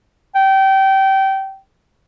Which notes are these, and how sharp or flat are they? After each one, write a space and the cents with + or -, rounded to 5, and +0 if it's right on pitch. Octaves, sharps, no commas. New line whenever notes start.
G5 -25